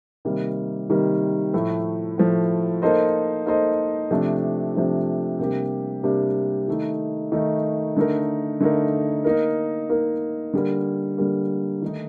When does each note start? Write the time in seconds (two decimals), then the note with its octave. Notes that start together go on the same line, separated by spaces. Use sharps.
0.25 C3 D#3 G3 A#3
0.89 C3 D#3 G3 A#3
1.53 A2 F3 A3
2.18 A2 F3 A3
2.82 A#3 D#4 A4 C5 D#5
3.46 A#3 D#4 A4 C5 D#5
4.11 C3 F3 A3 D4
4.75 C3 F3 A3 D4
5.39 C3 G3 A#3 D4 G4
6.03 C3 G3 A#3 D4 G4
6.68 D#3 A3 D#4
7.32 D#3 A3 D#4
7.96 D3 A3 D#4 A#4
8.60 D3 A3 D#4 A#4
9.25 A#3 D#4 A#4
9.90 A#3 D#4 A#4
10.53 D3 G3 A#3
11.18 D3 G3 A#3
11.82 D#3 A3 D#4